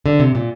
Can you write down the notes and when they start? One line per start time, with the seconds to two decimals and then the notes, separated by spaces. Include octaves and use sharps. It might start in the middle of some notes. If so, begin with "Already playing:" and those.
0.06 D3
0.20 C3
0.35 A#2